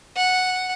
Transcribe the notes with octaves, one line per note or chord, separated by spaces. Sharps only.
F#5